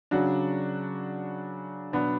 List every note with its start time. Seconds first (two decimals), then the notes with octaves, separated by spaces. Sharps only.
0.11 C#3 F#3 D4 F#4
1.93 B2 F#3 B3 D4